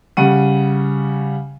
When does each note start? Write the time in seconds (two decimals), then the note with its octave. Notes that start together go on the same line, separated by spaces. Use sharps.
0.17 C#3 G3 F#5 D#7